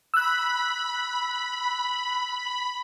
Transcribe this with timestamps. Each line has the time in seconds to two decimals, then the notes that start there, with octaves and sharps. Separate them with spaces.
0.14 B5 E6 F#6